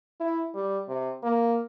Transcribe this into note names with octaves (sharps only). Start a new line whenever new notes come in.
E4
G3
C3
A#3